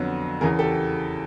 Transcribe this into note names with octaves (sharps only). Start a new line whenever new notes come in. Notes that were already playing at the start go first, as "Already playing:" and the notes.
Already playing: F2 D3 F#3 B3
E2 C#3 E3 G#4 A#4
G4 A4